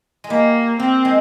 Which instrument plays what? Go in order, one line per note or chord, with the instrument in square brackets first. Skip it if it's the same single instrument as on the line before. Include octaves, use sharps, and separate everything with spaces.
[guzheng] G#3
[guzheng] G3 [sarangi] A#3
[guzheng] A#3 [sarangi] C4
[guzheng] G#3